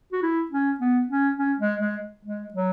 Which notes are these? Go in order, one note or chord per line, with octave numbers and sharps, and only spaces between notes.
F#4
E4
C#4
B3
C#4
C#4
G#3
G#3
G#3
F#3